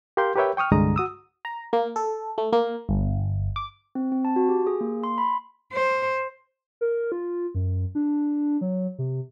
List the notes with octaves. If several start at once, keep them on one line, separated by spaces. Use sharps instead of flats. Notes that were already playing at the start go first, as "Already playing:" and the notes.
G4 A#4 F5 C6 G6
G4 A#4 B4 C#5 E5 G5
G5 C#6 D#6 F6
C2 G2 D3 G#3 A#5 D#6
F#4 D#6 E6
A#5
A#3
A4
A3
A#3
G1
D6
C4
C4
A5
F#4
G4
G#4
A#3
C6
B5
C5
A#4
F4
F#2
D4
F#3
C3